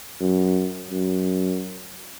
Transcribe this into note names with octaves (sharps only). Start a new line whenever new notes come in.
F#2
F#2